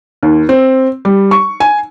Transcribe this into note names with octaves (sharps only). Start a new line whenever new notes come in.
D#2
C4
G3
C#6
G#5